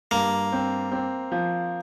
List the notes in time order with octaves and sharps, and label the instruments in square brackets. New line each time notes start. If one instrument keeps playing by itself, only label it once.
[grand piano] G2 [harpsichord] A#3
[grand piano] C4
C4
F3